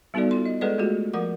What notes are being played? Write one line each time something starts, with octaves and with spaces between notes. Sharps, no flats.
G3 B3 D#4 F#4 A4 D5
F4 C6
D#5
G#3 G#4 A4 B4 D5 D#5
G#3 A3 F4 F#4 G#4
F3 A#4 F#5 D6